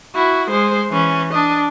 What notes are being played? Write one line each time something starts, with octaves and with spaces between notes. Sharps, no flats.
E4 F#4
G#3 C5
E3 C#4
D4 D#5